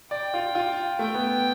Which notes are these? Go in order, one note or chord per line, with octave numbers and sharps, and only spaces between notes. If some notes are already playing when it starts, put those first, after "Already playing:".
D5 G5
F4
F4
A3 G5
B3